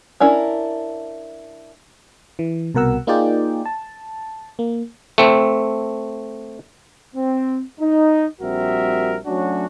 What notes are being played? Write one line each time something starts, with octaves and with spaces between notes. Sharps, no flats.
C#4 D4 E4 A#4
E3
C2 B2 A#4 F#5 E6
A#3 D#4 F4 G#4 D5 G5
A5
A#3
A3 C4
C4
D#4
A#1 G3 C4 F#4 A#4 E5
F#3 A3 C#4 D4 F#4